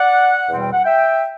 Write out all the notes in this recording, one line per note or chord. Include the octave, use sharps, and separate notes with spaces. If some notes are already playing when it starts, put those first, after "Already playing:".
Already playing: D5 F#5
E2 B2 G3 C4
G5
F#5
E5 G5